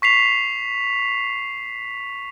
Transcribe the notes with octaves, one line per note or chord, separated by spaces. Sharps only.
C#6 B6 C7 F7